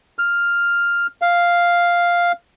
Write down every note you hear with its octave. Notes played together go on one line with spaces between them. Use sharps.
F6
F5